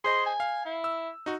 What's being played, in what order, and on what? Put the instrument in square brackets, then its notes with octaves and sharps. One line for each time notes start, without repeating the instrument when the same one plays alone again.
[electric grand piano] G#4 C5 D#5 [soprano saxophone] C6
[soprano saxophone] G#5
[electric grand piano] F5
[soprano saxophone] E4
[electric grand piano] E6
D#4 F#4